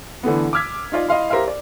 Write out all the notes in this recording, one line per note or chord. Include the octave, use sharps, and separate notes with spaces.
D3 E3 A3 B3
D6 E6 F6 G#6 B6
D#4 F4 D5
E4 D#5 F5 C6
G4 A#4 C5 E5 F5
D5